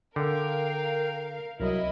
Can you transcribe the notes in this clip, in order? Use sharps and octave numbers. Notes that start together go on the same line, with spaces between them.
D3 A#4 F5 G5
C2 F#3 E4 A#4 D#5